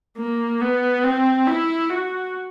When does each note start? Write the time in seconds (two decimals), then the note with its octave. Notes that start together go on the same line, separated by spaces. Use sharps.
0.18 A#3
0.61 B3
1.04 C4
1.47 E4
1.90 F#4